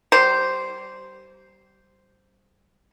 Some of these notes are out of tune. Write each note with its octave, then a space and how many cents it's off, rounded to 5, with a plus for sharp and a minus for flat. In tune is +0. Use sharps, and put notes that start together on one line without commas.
G3 -30 C5 -5